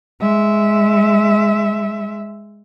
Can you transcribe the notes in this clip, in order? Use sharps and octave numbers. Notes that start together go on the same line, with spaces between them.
G#3 E5